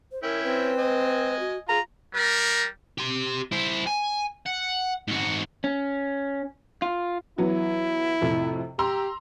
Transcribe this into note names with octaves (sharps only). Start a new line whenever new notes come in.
C5
C#4 E4 A#4 G5
C4 B4
D#5 G#5
F#4
F4 G#4 A#5
G3 A#4
G4 C6
E4 C5
G#5
F#5
G#2 F#4
C#4
F4
E3 F#3 B3 E4
F2 A2 C3
G4 A#5 C6 E6